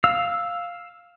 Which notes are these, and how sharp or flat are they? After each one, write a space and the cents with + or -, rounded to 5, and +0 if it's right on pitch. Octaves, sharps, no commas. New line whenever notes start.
F5 +0 E6 +0